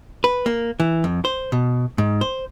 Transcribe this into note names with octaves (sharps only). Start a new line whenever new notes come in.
B4
A#3
E3
F2
C5
B2
G#2
C5